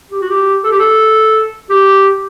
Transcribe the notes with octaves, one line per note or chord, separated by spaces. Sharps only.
G4
F#4
G4
A4
G4
A4
G4